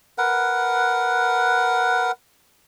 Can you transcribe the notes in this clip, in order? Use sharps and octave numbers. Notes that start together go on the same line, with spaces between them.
A#4 B4 F#5